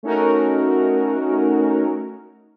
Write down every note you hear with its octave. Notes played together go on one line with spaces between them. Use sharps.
A3 C#4 D#4 F#4 A#4